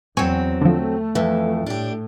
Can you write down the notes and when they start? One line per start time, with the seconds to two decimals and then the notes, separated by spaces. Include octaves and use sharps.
0.17 E2 F#3 C4 G#5 C#6
0.61 D3 F3 A3
1.15 F2 E3
1.66 A2 D4 G4